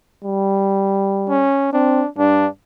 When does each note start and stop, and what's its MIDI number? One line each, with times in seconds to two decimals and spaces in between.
0.24 1.48 55
1.29 1.72 61
1.73 2.03 60
1.73 2.08 62
2.18 2.46 43
2.18 2.48 62